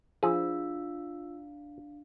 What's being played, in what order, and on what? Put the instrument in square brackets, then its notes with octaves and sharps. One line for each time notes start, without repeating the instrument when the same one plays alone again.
[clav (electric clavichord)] F3 G#4 [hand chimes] D4 E4 F5 [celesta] F4 E6